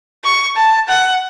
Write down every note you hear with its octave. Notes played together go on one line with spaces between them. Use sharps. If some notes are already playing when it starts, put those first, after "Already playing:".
C#6
A5
F#5